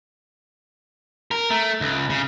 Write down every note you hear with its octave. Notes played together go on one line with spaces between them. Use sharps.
A#4
A3
C#2
C#3